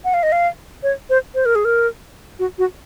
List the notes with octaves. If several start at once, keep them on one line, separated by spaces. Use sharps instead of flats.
F#5
F5
D#5
F5
C#5
C5
C5
A#4
G#4
A#4
F#4
F#4